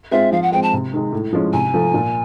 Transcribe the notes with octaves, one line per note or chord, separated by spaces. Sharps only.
G#3 C4 F4 E5
F3 F5
F#5
G#3 C4 G5
A5
C3
D#3 G#3
A2
F3 G#3 C#4
C3 G#5
F3 A3
A#2